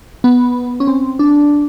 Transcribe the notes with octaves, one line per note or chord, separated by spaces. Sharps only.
B3
C#4
C4
D4